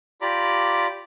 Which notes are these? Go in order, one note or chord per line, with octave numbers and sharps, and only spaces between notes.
F4 G4 D5 A#5 B5 D6